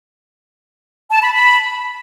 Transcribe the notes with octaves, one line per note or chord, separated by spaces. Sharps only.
A5
B5
B5